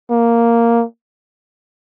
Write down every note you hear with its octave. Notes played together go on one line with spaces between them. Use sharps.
A#3